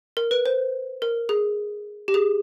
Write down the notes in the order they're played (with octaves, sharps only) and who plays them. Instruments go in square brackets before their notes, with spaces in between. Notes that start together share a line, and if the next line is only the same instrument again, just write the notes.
[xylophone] A#4
B4
C5
A#4
G#4
G4
G#4